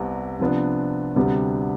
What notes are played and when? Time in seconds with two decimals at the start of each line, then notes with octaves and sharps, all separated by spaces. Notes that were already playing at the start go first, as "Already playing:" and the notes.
Already playing: C2 C3 G3 B3
0.40 C3 F3 B3 D4
1.16 D2 C3 G3 B3 D4